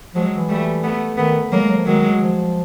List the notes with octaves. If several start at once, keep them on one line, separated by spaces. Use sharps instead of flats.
F3 F#3 G#3
E3
G3 A3
A3 B3
D#3 A3 B3
F#3 G#3 A#3
F#3
F3
D#3 F#3 G#3
F3